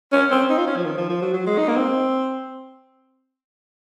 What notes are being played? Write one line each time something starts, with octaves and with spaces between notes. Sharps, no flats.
C#4
C4
D#4
F4
C#4
F3
D#3
F3
F3
F#3
F#3
G#3
D#4
A#3
C4